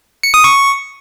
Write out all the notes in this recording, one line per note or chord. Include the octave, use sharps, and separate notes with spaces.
C#7
D#6
C#6